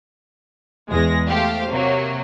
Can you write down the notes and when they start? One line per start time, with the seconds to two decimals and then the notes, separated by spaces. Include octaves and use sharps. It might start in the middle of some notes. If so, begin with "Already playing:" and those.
0.90 E2 G#3 A#6
1.29 A3 G4 C5 F5
1.71 C3 F#3 A#3